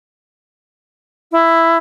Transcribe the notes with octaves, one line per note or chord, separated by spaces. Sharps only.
E4